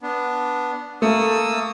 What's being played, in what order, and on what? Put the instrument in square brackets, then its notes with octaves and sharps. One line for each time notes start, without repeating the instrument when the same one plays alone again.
[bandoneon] B3 D4
[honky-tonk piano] A3 [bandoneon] A#3 D#6 E6